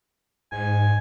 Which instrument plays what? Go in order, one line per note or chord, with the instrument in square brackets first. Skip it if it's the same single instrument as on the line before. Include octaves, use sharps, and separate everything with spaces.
[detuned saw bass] G#2 [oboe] G#5